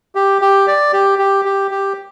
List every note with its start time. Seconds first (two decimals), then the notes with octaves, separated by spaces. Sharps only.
0.15 G4
0.42 G4
0.67 D5
0.93 G4
1.19 G4
1.45 G4
1.71 G4